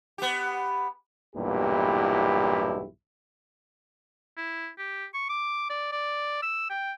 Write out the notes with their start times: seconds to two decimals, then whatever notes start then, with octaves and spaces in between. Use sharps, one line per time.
0.18 B3 G4
1.35 B1 E2 G2 A#2 E4 G4
4.37 E4
4.78 G4
5.14 C#6
5.29 D6
5.70 D5
5.92 D5
6.42 E6
6.70 G5